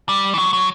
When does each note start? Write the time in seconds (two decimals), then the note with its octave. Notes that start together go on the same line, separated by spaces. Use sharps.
0.09 G3
0.34 E3
0.38 F#3
0.53 F#3